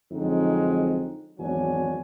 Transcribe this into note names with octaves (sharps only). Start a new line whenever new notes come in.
F2 D3 F#3 G#3 C4 D#4
G#1 E2 F#3 D4 C#5 G#5